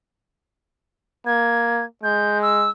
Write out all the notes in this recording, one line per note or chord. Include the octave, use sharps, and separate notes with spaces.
A#3 G#6
G#3 G6
E6